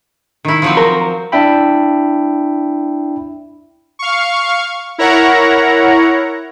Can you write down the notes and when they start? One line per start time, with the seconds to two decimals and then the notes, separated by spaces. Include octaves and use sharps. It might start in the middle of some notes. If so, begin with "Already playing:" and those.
0.45 D#3 E4
0.62 F3 F#3 C4
0.77 A#4
1.32 D4 E4 E5 G5 B5
3.99 F5 C#6
4.98 E4 A#4 C#5 F#5 A#5